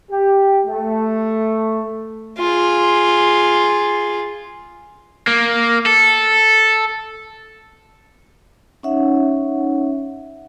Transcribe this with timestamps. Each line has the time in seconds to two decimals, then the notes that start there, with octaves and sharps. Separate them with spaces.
0.10 G4
0.66 A3
2.38 F4 G#4
5.27 A#3
5.86 A4
8.83 C#4 D#4 C#5 E5 F#5